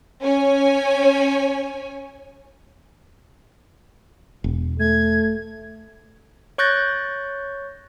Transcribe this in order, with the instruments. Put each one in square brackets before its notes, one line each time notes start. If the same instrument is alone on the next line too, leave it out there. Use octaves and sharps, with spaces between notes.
[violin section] C#4 C#5 G#5
[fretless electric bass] E1
[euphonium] A3 [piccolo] G#6
[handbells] C#5 C#6 F#6 G6 A6 A#6